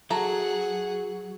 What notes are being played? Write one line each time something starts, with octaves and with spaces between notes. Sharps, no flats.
F#3 G#4 A4 F#5 A#5